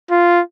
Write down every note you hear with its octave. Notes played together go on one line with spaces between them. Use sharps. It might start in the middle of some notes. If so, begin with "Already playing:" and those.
F4